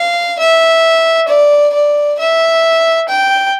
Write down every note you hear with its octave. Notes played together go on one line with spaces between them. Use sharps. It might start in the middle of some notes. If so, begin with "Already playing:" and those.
Already playing: F5
E5
D5
D5
E5
G5